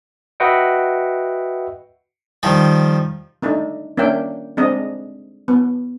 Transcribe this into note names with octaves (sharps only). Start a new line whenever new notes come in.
F#4 B4 D#5 E5 F#5 G5
D#3 F3 G3
A3 D4 D#4
A#3 C#4 D4 E5 G5
G#3 C4 D4 D#5
B3